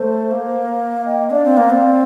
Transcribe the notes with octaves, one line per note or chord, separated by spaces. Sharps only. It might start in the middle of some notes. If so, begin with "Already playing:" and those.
Already playing: A3 C5
A#3
F5
D#5 G5
D4 D5 F5
C4
A#3
C4